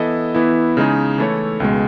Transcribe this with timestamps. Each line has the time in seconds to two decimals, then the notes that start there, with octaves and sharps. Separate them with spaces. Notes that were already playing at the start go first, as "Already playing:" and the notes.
Already playing: E3 B3 E4 A4 D#5
0.34 E3 B3 E4
0.77 C#3 G#3 D#4 G#4
1.18 E3 A3 E4 A4 C#5
1.60 C#2 B2 G#3